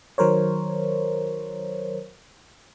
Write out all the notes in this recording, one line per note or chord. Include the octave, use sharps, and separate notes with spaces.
D#3 F#3 A#4 C5 C#5